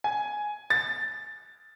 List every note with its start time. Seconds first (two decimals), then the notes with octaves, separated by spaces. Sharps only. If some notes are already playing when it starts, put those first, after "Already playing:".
0.04 G#5
0.70 A6